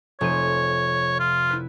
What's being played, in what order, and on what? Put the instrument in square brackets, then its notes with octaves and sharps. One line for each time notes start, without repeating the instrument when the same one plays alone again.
[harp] F1 C5 D#7 [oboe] C#5
[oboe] F4
[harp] E4 B4